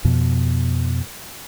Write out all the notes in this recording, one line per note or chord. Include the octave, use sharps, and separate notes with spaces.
F2 B2